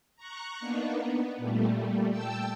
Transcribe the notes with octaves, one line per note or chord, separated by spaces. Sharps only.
A#5 C#6 F#6
A#3 B3 D4 D#4
B3
A#2 G3 A3
G5 A5 E6